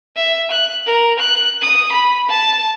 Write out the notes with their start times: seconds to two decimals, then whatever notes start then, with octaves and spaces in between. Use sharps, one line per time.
0.16 E5
0.51 F#6
0.86 A#4
1.19 F#6
1.61 D#6
1.92 B5
2.29 A5